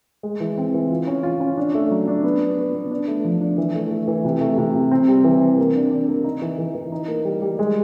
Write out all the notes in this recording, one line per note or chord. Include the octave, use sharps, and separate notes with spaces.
G#3
E3
C4
E3
F4
C#4
F4
C#4
D4
A3
F#3
D4
B3
B3
B3
B3
D4
A3
F3
D4
E3
A3
A3
E3
C3
A3
C3
C3
C4
G3
E3
C4
A#3
D4
D4
A#3
D#4
E3
E3
E3
D#4
A#3
G3
G3
G#3